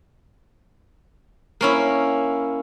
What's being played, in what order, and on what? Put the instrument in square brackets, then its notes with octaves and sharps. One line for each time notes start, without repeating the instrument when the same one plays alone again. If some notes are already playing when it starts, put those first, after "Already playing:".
[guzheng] A#3 C#4 E4